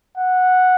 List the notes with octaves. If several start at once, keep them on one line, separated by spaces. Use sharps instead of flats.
F#5